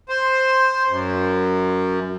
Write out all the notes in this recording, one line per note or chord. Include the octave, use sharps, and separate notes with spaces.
C5
F#2